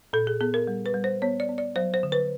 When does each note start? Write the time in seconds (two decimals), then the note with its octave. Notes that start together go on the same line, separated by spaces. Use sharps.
0.13 A#2 A4
0.27 G#4
0.41 B3 G#4
0.54 A#4
0.67 G3
0.86 B4
0.94 G3
1.04 C5
1.22 B3 C#5
1.40 D5
1.49 B3
1.58 D5
1.76 F#3 C5
1.94 C5
2.03 D3
2.12 B4